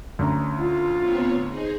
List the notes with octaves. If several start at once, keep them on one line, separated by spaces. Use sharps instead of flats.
D2 C#4 A#5
F4
B3 C4 C#5
D#4 G#4 C5